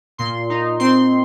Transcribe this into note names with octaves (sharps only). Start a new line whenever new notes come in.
A#2 C6
D#4
C4 C6